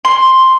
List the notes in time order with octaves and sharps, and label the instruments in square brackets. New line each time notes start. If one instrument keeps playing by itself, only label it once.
[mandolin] C6